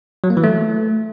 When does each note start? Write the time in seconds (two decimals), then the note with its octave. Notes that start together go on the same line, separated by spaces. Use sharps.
0.24 F#3
0.30 A#3
0.37 E3
0.44 A3